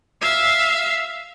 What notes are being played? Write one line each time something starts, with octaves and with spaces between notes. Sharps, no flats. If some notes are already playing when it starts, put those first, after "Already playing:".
E5 F5